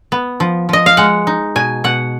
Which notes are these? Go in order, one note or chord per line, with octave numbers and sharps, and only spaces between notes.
B3
F3
F3 D#5
F5
G#3 F#5
D#4
B2 G#5
B2 F#5